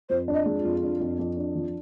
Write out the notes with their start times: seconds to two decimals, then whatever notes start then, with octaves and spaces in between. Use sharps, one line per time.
0.09 F2 C5
0.28 D4
0.34 D#5
0.46 G#3
0.58 F4
0.64 F2
0.83 D4
1.00 F2
1.19 F2
1.37 D4
1.55 F3